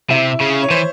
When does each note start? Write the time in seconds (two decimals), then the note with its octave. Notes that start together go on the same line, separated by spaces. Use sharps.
0.11 C3 E4
0.41 C#3
0.63 C#5
0.70 E3 C5